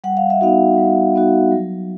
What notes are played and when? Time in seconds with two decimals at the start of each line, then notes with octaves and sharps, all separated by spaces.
0.04 G3 F#5
0.17 F5
0.30 E5
0.41 B3 D#4 F#4 F5
0.78 G3
1.15 B3 D#4 F#4
1.52 F#3